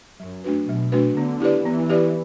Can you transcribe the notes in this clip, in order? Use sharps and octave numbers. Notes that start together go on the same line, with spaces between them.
F#2 F#3
A3 D4 F#4 B4
B2 F#3
A3 D4 F#4 B4
D3 B3
E4 G4 B4 D5
E3 B3
E4 G4 B4 D5